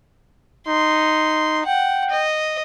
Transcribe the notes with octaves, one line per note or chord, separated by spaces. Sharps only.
D#4 C6
F#5 G5
D#5